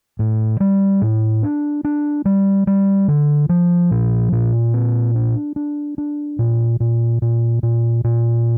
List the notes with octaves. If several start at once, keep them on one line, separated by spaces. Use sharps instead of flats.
A2
G3
A2
D4
D4
G3
G3
D3
F3
A#2
A#2
C4
D4
D4
D4
A#2
A#2
A#2
A#2
A#2